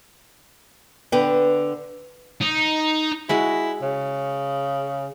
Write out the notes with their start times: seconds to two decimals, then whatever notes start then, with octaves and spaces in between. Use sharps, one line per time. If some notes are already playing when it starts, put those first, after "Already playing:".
1.12 D3 B3 B4 G5
2.42 D#4
3.29 G#3 E4 F#4 G#4
3.82 C#3